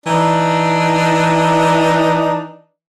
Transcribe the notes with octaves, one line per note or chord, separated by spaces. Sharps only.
E3 D4 D#4